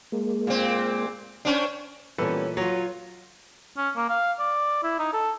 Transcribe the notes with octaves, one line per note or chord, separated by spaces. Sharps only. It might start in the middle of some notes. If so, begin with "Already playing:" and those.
G#3 A#3
A#2 C4
C#4 D4 C5 G5
A#2 E3 G3 B3 C#4 A4 B4
F#3 F4 C#5
C#4
A#3
F5
D5
E4
D#4
A4